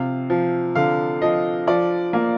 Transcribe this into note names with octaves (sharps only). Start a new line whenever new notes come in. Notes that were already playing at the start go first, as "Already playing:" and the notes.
Already playing: C3 F3 F5
F3
D3 F5
F3 D#5
F3 D5
A#3